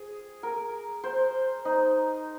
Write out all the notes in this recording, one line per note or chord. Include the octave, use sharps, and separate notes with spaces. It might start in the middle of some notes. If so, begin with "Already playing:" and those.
Already playing: G#4
A#4
C5
D#4